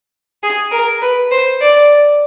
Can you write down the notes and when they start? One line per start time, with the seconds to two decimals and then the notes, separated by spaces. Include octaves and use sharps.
0.43 G#4
0.72 A#4
1.02 B4
1.32 C5
1.61 D5